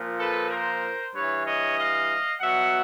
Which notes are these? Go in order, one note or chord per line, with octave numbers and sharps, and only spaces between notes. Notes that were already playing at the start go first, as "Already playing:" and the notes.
Already playing: A#2 F3
A4 B4
A#4 C5
G2 E3 B4 C#5
C#5 D#5
D#5 F5
B2 F#3 E5 F#5